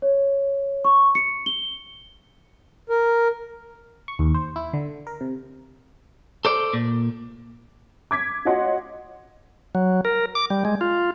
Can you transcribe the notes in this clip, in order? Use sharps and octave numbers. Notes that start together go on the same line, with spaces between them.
C#5
C#6
C#7
G7
A#4
C#6
D#2
C5
E4
D3
A#4
C3
A4 C5 D5
A#2
D6 G#6 B6
F4 F#4 C#5 D#5 F#5 C6
F#3
A#4
D6
G3
G#3
F4